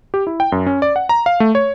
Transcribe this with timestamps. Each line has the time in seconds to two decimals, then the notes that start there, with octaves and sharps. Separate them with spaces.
0.14 G4
0.27 E4
0.40 G5
0.52 F#2
0.67 C#4
0.82 D5
0.96 F#5
1.09 A#5
1.26 F5
1.40 A3
1.55 C#5